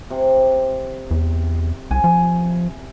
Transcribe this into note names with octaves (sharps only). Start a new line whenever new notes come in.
C3
E2
C2 G#5
F3